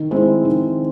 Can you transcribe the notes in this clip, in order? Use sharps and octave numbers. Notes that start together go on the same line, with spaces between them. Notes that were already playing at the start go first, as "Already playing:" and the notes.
Already playing: D#3
G#3 C4 E4
D#3